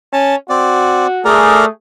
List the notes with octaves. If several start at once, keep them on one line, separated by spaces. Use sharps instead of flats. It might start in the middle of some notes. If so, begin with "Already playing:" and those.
C#4 A5
C4 F#4 D5
A3 G#4 A#4 D5 A#5